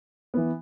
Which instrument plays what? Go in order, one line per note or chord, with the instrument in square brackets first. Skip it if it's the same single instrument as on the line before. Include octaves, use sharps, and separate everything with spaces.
[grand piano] E3 B3